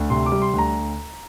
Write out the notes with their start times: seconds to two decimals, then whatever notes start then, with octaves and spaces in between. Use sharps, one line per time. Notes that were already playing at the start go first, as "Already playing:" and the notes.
Already playing: D2
0.10 C3 C6
0.26 D6
0.32 G3
0.42 C6
0.54 D2 A#5